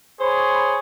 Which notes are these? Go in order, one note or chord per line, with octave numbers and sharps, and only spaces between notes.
G#4 C5 C#5 B5